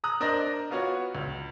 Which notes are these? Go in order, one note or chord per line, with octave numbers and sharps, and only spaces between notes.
A#5 D#6 F#6
D4 A#4 C5 D5 D#5
B3 F4 F#4 C#5
C#2